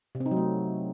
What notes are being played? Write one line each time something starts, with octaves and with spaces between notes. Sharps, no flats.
C3
C4
D#4
F#3
A3